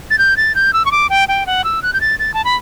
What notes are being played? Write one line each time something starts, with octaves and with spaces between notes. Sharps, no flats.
A6
G6
A6
G6
E6
C#6
D6
G5
G5
F#5
E6
F#6
G6
A6
A6
A5
B5